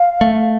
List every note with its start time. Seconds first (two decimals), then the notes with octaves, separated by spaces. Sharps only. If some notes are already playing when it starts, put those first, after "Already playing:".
Already playing: F5
0.21 A3